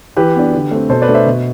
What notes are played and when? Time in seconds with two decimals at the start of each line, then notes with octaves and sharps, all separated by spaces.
0.17 E3 G4 B4
0.35 B3 D4
0.53 D3
0.71 A3 C4
0.89 B2 A4 C5
1.02 B4 D5
1.09 A3 D4
1.14 C5 E5
1.26 B2